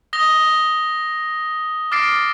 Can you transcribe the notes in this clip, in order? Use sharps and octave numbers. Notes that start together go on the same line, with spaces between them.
D#6 A#6 G7
D6 F6 A6 A#6 C7 D7